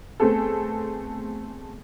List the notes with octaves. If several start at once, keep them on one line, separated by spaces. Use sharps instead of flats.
A3 B3 C4 G#4 A4